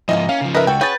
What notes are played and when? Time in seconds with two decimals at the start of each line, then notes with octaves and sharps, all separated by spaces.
0.09 G#2 E3 F3 G3 A#3 D#5
0.29 C#4 F5
0.41 C#3 F3
0.55 A#4 B4 D#5 E5
0.67 C#2 F#4 A4 G5
0.81 C#4 F#4 G#4 B4 G6 A6